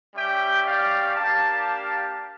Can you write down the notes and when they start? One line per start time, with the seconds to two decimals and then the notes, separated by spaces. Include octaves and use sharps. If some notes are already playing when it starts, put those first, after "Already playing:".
0.14 G3 C#4 G4 E5 G5
0.65 D5 F5
1.15 A#3 D4 G4 F5 A5